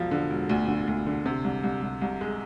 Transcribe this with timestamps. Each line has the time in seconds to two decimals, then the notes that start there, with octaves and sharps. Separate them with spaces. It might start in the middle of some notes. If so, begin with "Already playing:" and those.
Already playing: E1 F3
0.11 D3
0.30 E1
0.49 D2
0.68 D3
0.88 D2
1.07 D3
1.26 C3
1.44 C2
1.63 C2
1.82 C2
2.01 C2
2.21 G#3